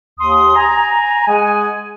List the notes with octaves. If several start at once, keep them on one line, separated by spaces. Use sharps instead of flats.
D#2 C6 D#6
G#5 A#5
G#3 G#4 F#5 G#5